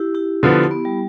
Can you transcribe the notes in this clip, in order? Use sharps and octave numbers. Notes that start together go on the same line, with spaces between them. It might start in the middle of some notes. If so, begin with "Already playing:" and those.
Already playing: E4 G4
E4 G4
D3 F3 B3
B3
G3